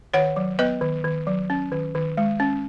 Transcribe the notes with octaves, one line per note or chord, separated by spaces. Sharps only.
D#3 C#5 F#5
F#3
B3 B4 D#5
D#3
D#3
F#3
C#4
D#3
D#3
G#3
C#4